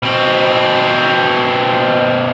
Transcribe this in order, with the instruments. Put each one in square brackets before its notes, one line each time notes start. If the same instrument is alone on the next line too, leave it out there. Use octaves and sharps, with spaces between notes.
[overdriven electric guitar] B2 C4